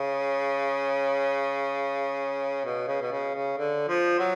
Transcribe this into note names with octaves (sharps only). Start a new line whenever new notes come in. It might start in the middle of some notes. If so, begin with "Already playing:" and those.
Already playing: C#3
B2
C#3
B2
C#3
C#3
D3
F3
F#3